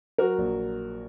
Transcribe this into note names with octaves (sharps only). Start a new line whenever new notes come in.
F#3 F#4 A#4
A#1